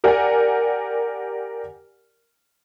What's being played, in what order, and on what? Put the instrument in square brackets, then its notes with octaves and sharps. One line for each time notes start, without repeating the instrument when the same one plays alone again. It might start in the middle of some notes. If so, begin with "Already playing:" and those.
[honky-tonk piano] G4 A#4 D5 F#5 G#5